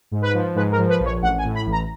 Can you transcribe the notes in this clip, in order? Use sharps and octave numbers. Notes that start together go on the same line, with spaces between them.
G#2
B4
F3
G#2 B4
A#4
F3
B4
A#1
C#5
A1 F#5
G#5
A2
B5
A1
A#5